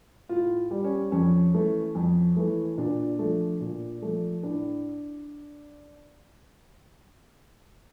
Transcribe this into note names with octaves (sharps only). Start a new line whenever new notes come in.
A2 F4
G3
C#4
F2 C#4
E3 A3
F2
E3 A3
A#2 D4
F3 A3
A#2
F3 A3
A2 D4